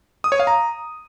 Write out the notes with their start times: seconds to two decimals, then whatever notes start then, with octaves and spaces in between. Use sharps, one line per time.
0.24 D#6
0.32 C#5
0.40 F5
0.47 A#5